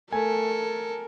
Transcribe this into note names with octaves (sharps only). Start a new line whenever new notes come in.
A3 A4 A#4 G#5